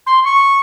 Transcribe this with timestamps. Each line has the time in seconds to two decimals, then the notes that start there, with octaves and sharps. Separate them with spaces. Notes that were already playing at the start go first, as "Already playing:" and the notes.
0.07 C6
0.25 C#6